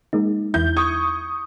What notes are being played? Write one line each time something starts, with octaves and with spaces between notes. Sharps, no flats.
G#3 A#3 D#4
E2 E4 G6
C#6 D#6 G#6